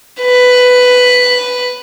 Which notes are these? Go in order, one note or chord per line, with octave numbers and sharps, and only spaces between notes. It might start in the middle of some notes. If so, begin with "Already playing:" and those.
B4